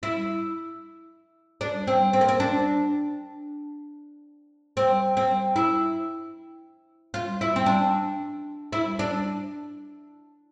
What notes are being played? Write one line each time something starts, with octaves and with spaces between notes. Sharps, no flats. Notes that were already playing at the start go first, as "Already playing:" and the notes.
E4
D4
C4
C4
A#3
C4
D4
C4
C4
E4
F4
E4
C4
D4
E4
D4